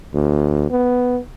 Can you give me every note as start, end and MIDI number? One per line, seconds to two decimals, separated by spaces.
0.14 0.67 38
0.71 1.18 59